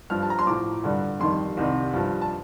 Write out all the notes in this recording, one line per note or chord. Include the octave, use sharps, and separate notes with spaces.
G2 F3 F6
A5
A#5
C6
A2 F3 D6
G2 D3 G3
F2 D#3 G3 C6
C2 C3 D#3 G3
G2 F3
A5